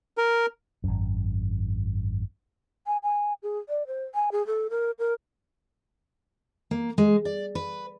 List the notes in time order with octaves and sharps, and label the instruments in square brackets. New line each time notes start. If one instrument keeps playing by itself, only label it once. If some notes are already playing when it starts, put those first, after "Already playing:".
[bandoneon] A#4
[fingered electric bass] G#1 F#2
[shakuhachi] G#5
G#5
G#4
D5
C5
G#5
G#4
A4
A#4
A#4
[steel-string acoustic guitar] A#3
G#3
D5
B4